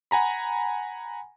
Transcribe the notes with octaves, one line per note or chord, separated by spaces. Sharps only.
F#5 G#5 A#5 B5